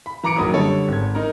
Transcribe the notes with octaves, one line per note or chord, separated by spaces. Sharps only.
B5
E3 A#5 D6 C#7 D7
F#1 D#3 F#3 B5 D#6
D3 G3 A4 C#5
G#1 G#6
D#4 A#4